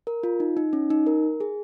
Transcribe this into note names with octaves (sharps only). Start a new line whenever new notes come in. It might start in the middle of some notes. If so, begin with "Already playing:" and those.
A#4
F4
D#4
D#4
C#4
D#4
A#4
G#4